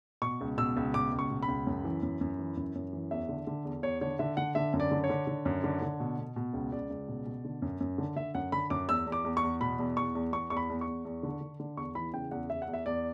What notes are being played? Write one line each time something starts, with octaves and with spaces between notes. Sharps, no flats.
B2 C#6
C#2
B2 E6
C#2
B2 D6
C#2
C#6
B2
B5
C#2
F#2
E3
F#2
F#2
E3
F#2
F#2
E3
E2 E5
D3
D3
E2
E2 C#5
D3 C#5
D3 E5
D3 F#5
D3 E5
F#2
D5
D3
C#5
D3
D3
F#2
D3
D3
B2
B2
B2
C#2
C#2 D5
C#2
B2
B2
D3
F#2
F#2
D3
D3 E5
F#2 F#5
D3 B5
F#2 D6
E2 E6
E2
D6
E2
C#6
E2
B2 B5
E2
E2 C#6
E2
E2 C#6
E2 C#6
B5
E2
C#6
E2
E2
D3
D3
D3
E2 C#6
E3 B5
C#3 G5
E2 F#5
E2 E5
F#5
E2
E5
E2 D5